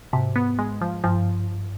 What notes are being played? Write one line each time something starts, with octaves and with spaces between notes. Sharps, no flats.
G#2 C3
B3
G#3
F3
G2 F3